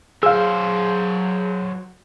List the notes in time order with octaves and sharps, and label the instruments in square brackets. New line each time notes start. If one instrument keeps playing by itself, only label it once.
[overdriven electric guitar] F#3 C5 [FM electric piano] G#4 [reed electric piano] F5 E6